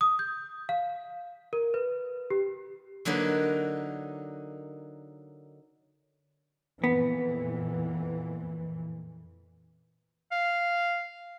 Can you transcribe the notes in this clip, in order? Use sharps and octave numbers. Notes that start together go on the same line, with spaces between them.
D#6
G6
F5
A#4
B4
G4
D3 F#3 A#3 D#4 B4
F2 A#2 E3 B3
F5